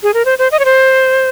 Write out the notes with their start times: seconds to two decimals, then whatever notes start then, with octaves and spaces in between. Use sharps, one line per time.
0.03 G#4
0.14 A#4
0.25 C5
0.39 C5
0.52 D#5
0.59 C#5
0.65 C5